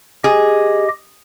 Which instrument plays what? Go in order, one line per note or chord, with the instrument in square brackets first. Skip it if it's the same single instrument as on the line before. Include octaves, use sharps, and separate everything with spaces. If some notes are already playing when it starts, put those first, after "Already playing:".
[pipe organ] G4 D#5 [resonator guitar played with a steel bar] G#4